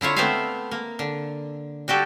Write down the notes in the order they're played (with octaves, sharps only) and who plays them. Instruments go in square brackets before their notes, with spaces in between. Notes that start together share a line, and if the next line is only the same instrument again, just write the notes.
[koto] D3 E4 F4 C#5
A3 B3 C4 E4 E5 F5
A#3
D3
G3 F#4 G4 A4